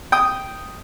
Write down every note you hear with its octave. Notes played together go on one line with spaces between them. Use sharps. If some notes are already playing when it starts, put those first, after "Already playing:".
G5 D#6